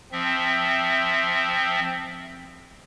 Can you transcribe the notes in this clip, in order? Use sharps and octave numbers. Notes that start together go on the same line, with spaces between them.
F3 C4 E5